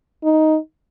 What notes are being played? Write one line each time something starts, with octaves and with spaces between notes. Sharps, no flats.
D#4